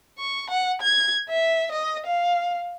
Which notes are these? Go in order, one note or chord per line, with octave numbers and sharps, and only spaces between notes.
C#6
F#5
G#6
E5
D#5
F5